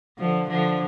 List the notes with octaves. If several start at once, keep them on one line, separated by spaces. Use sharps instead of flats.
D3 F3
D3 F3